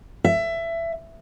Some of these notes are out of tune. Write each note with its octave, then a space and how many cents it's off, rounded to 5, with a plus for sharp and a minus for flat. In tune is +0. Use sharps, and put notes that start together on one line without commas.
E5 +20